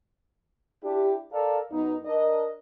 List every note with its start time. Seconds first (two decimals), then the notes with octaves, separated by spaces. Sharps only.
0.83 D4 E4 G4
1.31 A4 A#4 D5 F5
1.71 F#2 B3 D#4
2.05 D4 A#4 D#5